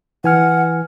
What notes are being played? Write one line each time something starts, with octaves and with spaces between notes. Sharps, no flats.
E3 F#5 G#5 F6